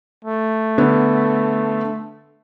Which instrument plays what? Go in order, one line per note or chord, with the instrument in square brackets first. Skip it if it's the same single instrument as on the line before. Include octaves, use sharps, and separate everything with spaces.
[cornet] A3
[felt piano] D3 B3